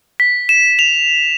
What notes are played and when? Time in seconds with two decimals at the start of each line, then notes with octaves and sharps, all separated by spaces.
0.20 B6
0.49 E7
0.79 F7